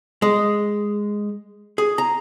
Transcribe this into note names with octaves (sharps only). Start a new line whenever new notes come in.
G#3
G#4
A#5